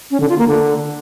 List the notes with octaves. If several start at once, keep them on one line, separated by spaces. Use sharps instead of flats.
C#4
D3
F4
A#3
D3